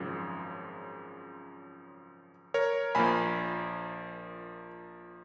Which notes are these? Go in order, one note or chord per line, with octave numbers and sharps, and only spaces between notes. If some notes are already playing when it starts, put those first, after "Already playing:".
Already playing: G#1 F#2 C#3 F3
A#4 C#5
A#1 F3 A#3 G#5 B5